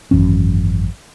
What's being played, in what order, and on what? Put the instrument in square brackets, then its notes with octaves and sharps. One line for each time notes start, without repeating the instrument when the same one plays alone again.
[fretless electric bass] G#1 F#2 E3 C#4